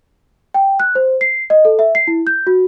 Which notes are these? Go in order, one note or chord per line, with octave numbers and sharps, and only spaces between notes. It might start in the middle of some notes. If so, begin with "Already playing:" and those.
G5
F#6
C5
C7
D#5
A4
E5
C7
E4
G6
F#4